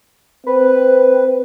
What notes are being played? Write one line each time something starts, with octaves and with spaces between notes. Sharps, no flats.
C4 B4